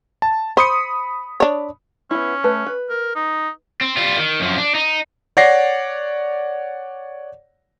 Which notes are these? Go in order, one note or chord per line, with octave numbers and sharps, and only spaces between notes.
A5
C5 B5 D#6 C#7
D4 C#5
B3 C#4 E4
A3 B4
B4
A#4
D#4
C4
G3 F4
D#3
F#2 F3
D4
D#4
C#5 D5 F#5 A#6 C7